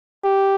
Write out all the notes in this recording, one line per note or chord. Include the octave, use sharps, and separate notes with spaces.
G4